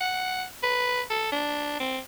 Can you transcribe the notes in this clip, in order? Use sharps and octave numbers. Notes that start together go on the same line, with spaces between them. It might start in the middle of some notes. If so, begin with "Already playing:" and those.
F#5
B4
A4
D4
C4